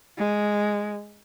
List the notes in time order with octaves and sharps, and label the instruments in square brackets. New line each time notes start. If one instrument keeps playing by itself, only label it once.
[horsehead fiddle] G#3